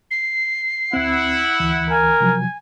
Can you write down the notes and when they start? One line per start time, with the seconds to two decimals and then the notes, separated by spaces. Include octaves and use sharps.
0.11 C7
0.93 D2 C4 E4 F#5
1.60 D2 E3
1.90 A#4 G#5
2.20 C3 F3 F#3